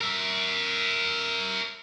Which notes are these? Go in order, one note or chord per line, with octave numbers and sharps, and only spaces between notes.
A#4 E5